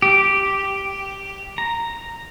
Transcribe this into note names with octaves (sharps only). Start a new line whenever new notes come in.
G4
A#5